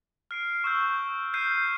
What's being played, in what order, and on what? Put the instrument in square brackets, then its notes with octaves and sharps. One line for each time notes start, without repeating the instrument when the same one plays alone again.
[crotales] F6 C7 D7
C#6 E6 G6
F6 G6 C7 D#7